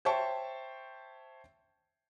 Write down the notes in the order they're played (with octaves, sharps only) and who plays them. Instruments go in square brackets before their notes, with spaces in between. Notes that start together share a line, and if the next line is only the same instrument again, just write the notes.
[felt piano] C5 C#5 E5 G5 A5 C#6